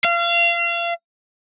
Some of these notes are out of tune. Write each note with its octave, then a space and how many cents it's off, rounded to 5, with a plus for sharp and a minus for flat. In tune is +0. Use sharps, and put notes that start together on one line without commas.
F5 -30